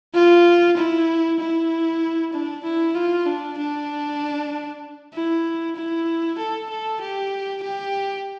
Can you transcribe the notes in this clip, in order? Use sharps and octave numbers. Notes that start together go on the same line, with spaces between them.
F4
E4
E4
D4
E4
F4
D4
D4
E4
E4
A4
A4
G4
G4